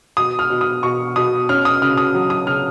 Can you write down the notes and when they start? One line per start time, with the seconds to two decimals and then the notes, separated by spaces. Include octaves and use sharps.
0.17 B2 D#6
0.39 F6
0.50 B2
0.61 D#6
0.83 B2 C#6
1.16 B2 D#6
1.49 C#4 F6
1.65 D#6
1.82 C#3 F6
1.98 D#6
2.14 F#3
2.30 D#6
2.47 C#3 F6